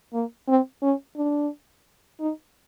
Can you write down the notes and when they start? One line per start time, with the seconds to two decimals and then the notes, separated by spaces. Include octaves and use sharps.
0.13 A#3
0.48 C4
0.83 C#4
1.17 D4
2.20 D#4